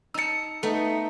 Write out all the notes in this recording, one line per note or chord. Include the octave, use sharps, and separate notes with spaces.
D#4 A5 E6 C#7
A3 B3 D#4 E5